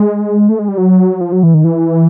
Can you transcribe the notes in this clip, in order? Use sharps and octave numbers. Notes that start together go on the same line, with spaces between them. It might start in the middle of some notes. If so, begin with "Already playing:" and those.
Already playing: G#3
A3
G#3
G3
F#3
F3
F#3
E3
D#3
E3